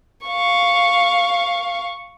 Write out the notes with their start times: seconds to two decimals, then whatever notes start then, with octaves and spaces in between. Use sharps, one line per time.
0.27 F5 C#6